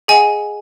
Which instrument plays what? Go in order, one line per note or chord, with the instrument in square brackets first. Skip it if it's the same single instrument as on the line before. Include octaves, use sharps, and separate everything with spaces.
[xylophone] G#4 D#5 F#5 G#5